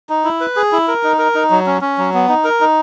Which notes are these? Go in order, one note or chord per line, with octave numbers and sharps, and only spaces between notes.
D#4
E4
B4
G#4
E4
A#4
D#4
A#4
D#4
F#3
C#4
C#4
F#3
B3
D#4
A#4
D#4